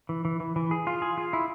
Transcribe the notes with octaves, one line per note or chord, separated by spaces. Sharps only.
E3
E3
E3
E3
G#4
F4
G#4
F4
E4